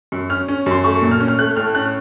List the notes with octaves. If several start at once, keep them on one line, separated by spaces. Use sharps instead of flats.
F#2
C#4 F6
C#4
F#2 C6
A3 C#6
A#2
F6
C#4
F6
A3 F#6
A2 F6
C#4 F#6